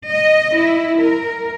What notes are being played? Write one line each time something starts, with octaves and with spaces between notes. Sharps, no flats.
D#5
E4
A#4